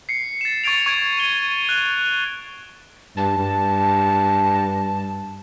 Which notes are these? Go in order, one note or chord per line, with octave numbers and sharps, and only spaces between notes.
C7 C#7
A6 E7
C#6 G#6 A6 D7 F7
C#6 G#6 D7
D#7 G7
F#6
G2 A5
G2